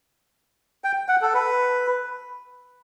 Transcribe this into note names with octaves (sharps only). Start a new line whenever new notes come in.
G5
F#5
A4
B4